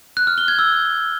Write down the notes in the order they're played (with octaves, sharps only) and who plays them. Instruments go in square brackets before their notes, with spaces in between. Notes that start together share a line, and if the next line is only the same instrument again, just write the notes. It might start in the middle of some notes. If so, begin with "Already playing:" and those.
[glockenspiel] F#6
F6
G7
G#6
E6